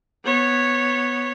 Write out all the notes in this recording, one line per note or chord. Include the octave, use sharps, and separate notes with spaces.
B3 C#5